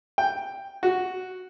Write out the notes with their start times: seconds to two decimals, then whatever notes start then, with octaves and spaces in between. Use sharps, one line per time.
0.18 G5
0.83 F#4